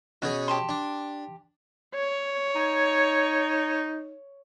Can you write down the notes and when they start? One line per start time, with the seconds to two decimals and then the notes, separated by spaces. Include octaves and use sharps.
0.22 B2 C#4 F#4 G#4
0.48 G4 A5 C6
0.69 D4
1.95 C#5
2.55 D#4